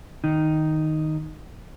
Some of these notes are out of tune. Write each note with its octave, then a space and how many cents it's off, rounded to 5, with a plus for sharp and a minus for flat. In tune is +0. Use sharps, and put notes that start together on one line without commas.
D#3 +0 D#4 +0